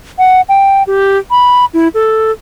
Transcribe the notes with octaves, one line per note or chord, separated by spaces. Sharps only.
F#5
G5
G4
B5
E4
A4